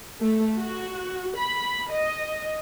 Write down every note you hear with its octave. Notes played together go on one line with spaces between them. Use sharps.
A3
F#4
B5
D#5